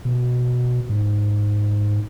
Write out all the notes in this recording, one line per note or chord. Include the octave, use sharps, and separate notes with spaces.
B2
G#2